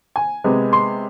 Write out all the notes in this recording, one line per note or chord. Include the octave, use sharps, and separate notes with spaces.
G#5
C3 G#3 B3
C6